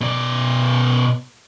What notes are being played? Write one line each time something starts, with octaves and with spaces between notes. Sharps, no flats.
B2 D5